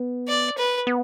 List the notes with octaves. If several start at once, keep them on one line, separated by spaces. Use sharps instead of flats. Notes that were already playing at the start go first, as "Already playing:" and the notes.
Already playing: B3
D5
B4
B3